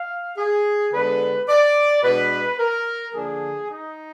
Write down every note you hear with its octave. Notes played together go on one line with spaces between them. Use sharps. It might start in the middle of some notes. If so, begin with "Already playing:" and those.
Already playing: F5
G#4
D3 G#3 B3 D4 B4
D5
B2 G#3 D4 B4
A#4
D3 F3 A#3 D4 G#4
D#4